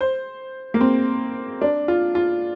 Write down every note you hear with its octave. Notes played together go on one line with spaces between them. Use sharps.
C5
A#3
C4
D4
F4
F4